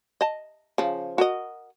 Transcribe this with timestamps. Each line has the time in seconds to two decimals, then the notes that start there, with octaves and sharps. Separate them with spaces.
0.21 D#5 A5
0.78 C#3 F3
1.18 F#4 A#4 D#5